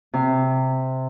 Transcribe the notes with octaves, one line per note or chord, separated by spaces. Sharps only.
C3